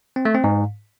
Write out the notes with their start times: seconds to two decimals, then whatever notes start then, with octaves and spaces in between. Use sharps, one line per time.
0.16 C4
0.25 A3
0.35 C4
0.44 G#2